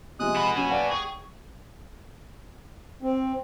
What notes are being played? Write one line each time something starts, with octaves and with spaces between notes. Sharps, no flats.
C3 F3 G#3 D#6 F#6
F#4 B4 B5
F#3 C#4 G#5
D5 F5 F#5 A5
G#4 G5 C#6
C4